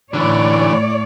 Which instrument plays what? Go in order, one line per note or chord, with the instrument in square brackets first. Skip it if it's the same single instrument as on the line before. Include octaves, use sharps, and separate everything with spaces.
[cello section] A2 C#5 D5 [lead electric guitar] D3 E3